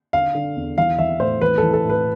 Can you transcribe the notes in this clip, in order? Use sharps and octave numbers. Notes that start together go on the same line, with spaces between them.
D3 F5
D3
E2
E3 F5
E3 E5
A2 C5
E3 B4
E3 A4
A4
A2
B4